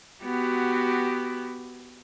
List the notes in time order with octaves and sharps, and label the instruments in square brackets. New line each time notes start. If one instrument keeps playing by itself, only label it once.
[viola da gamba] B3 F#4 G4